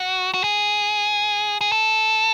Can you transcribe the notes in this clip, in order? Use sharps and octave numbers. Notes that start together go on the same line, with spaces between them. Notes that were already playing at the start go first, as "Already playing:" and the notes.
Already playing: F#4
F#4
G#4
G#4
A4